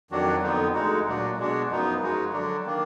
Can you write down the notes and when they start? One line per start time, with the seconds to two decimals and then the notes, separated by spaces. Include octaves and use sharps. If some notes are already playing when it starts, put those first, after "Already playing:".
0.11 F2 D#3 F#3 D4 F#4
0.43 F2 D3 F3 B3 D#4
0.74 D2 D3 G#3 D#4 F#4
1.06 A#2 F#3 D4 F#4
1.38 B2 G#3 D4 F#4
1.69 F#2 F3 B3 D#4
2.00 F#2 F3 G#3 D#4 F#4
2.32 D3 F#3 D4 F#4
2.64 D#3 A#3 D4